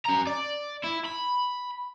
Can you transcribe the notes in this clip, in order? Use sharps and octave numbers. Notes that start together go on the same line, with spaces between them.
C#4 A#5
D5
E4
B5